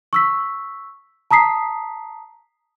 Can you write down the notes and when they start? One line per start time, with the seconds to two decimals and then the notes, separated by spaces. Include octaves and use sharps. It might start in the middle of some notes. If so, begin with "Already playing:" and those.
0.13 C#6 E6 B6
1.31 A5 A#5 D#6 B6 C7